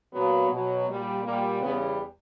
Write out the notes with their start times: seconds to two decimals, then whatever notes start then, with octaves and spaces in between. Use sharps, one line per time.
0.13 A#2 F#3 B3
0.49 B2 F#3
0.87 A#2 G3
1.23 A#2 G3 A#3
1.61 E2 C#3 G3 B3